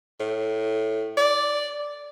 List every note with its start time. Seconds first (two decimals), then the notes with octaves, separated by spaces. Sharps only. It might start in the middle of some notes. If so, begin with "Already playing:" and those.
0.20 A2
1.17 D5